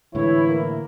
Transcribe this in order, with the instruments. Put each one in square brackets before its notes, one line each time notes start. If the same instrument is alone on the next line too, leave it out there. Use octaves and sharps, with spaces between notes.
[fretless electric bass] A2 D3 G#3 [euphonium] E3 [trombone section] E4 [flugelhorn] C#5
[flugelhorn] A#3